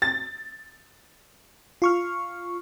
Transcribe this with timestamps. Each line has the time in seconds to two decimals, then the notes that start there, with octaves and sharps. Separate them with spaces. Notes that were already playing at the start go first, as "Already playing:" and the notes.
0.02 A6
1.82 F4 C#6 F6